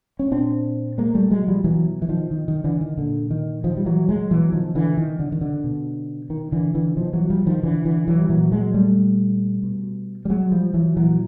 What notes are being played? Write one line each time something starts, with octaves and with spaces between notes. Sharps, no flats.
C#4
A#2 C4 D4
G#3 A#3
G3 A3
F#3 G#3
F3 G3
B2 E3 F#3
E3
D#3 F3
D#3
D#3
D3 E3
D#3
A#2 D3
D#3
D#3 F3
G3
E3 F#3
F#3 G#3
B2 E3 F#3
D#3 F3
D3 E3
D#3
D3
D#3
D3
B2
D#3
D3 E3
D3 E3
B2 D#3 F3
E3 F#3
F3 G3
D#3 F3
D3 E3
D3 E3
E3 F#3
G3
A#2 E3 F#3
F#3 G#3
G3 A3
B2
G3
F#3 G#3
F3 G3
E3 F#3
A#2 E3 F#3